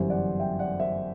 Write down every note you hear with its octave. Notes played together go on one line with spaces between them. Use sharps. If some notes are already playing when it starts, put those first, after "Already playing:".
Already playing: G1 F#2 E3 G3 C5 E5
D5 F#5
E5 G5
D5 F#5
C5 E5